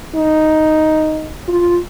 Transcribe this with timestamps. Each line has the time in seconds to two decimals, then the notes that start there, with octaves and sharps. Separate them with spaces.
0.16 D#4
1.48 F4